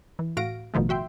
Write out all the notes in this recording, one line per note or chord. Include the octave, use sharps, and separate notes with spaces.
E3
A2 F#4 F5 A#6 D7
A1 B2 D#3 F3 A3
F#4 E5 G5 C6